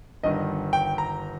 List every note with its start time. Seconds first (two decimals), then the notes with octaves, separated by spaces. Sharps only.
0.23 G1 G2 D#3 D#5
0.73 G5
0.98 A#5